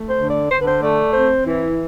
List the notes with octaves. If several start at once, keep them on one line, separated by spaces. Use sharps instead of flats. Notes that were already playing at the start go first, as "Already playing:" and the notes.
Already playing: A3
C5
D3
D5
D3 C5
B4
C5
A3 D5
C4 C5
E3 E4